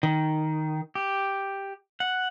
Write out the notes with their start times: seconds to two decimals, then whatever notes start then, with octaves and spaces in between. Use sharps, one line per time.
0.03 D#3
0.95 G4
2.00 F#5